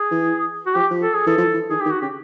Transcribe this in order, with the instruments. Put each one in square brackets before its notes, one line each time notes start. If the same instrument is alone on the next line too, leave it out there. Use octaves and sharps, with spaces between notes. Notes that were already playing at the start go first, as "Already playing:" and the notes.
Already playing: [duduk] G#4
[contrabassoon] E3
[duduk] F#4
[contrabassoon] F3 [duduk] G4
[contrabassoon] F3
[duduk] A4
G#4
[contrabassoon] E3 [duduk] A4
[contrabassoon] F3
E3
[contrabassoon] D#3 [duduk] G#4
[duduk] G4
[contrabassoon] D#3
[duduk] F#4
[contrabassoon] C#3 [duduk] G4